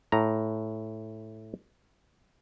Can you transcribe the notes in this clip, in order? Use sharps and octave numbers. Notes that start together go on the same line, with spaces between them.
A2 A#5